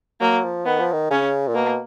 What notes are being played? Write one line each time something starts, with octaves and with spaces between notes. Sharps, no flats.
F#3 A#3
F3
D#3 B3
F3
D#3
C#3 C#4
A#2
B2 A#3